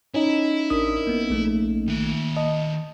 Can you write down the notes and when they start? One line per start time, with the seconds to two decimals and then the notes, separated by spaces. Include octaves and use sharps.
0.14 C#4 D#4 E4
0.70 A1 D4 A#4 D#6
1.07 A#3 B3
1.30 A#1 A3 A#3
1.87 D#3 E5
2.36 D#5 A5